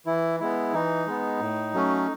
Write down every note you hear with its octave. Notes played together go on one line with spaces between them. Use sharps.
E3 E4
G#3 B3 E4
E3 D#4
G#3 B3
A2
F#3 A3 C#4